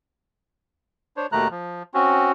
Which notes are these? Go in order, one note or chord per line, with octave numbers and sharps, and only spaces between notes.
D4 C5 C#5
D#2 B2 D#3 A3 A#5 F#6
F3
C4 C#4 F#4